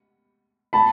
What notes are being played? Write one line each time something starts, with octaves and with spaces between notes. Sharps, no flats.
A5 B5